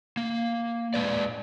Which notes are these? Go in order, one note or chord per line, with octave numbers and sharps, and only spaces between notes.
A#3
G#3 B4 D5